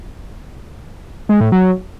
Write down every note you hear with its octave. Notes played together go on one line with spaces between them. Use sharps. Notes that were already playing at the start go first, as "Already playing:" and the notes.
G#3
A2
F#3